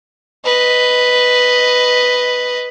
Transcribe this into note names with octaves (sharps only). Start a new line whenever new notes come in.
B4 D#5